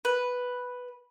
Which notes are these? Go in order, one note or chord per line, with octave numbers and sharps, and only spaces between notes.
B4